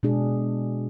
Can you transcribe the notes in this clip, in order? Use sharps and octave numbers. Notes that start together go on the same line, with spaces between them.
B2 G#3 D4 G#4